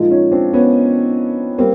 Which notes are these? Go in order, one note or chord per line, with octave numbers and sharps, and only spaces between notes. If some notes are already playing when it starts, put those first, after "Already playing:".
Already playing: A#2 F3 G#3 D#4 F4
C#4 D#4
C4 D4
B3 C#4
G3 A#3 C4